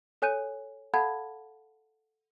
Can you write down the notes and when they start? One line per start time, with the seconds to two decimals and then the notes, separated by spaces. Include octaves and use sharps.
0.22 A4 C#5 G#5 F#6 G6 D#7
0.94 A4 F5 F#5 A5 B5 G#6